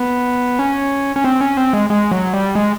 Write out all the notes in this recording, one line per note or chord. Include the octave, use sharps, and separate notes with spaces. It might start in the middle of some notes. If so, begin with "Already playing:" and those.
Already playing: B3
C#4
C#4
C4
C#4
C4
G#3
G#3
F#3
G3
G#3